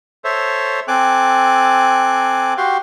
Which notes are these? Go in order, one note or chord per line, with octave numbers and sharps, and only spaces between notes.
A4 C5 C#5 E5
C4 A4 G#5 D6 F#6
F#4 G4 F5 C6